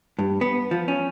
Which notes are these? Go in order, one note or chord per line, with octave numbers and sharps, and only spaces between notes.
G2
B3
F3
C#4